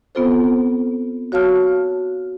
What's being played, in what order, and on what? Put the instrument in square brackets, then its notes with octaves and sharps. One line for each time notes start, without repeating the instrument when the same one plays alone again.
[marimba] B3 C4 F4 A4 C5
F#4 C#5 F5 A5 F6